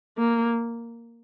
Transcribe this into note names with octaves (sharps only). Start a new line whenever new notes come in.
A#3